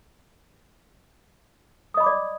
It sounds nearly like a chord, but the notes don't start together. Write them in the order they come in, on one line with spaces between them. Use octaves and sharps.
D#6 D#5 B5 D6 D5